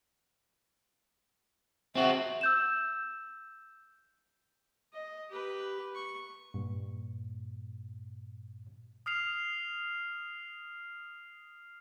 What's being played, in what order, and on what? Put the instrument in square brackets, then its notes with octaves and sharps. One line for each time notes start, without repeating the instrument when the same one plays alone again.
[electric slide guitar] C4 F#4 [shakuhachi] E5
[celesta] E6 G6 E7
[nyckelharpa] D#5
G4 B4
C#6
[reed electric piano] G2 A#2
[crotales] D#6 F6 C7 F7